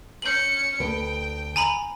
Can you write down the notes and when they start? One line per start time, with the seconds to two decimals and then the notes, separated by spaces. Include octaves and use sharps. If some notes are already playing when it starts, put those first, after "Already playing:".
0.22 C#4 G6 C#7 F#7
0.80 D2 B4 G5
1.56 G#5 A#5 B5